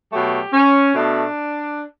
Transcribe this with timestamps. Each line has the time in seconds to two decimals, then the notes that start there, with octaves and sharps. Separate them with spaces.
0.11 B2 F#3 A3 G4
0.52 C#4
0.94 B2 A3 D4